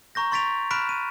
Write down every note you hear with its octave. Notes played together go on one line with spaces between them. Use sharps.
A#5 C#6 G6 A#6
C6 C#6 A6 B6 D7 F7
B5 F6 F#6 B6 D7 E7
D#7